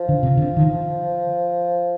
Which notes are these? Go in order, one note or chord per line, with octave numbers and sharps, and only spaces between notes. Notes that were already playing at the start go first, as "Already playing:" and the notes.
Already playing: F3
D3
C3
D3
D#3